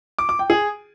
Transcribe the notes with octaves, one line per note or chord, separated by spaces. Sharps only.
D6
D6
G5
G#4